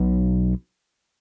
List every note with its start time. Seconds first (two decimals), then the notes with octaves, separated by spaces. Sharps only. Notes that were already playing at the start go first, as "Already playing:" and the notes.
Already playing: B1 B2 B3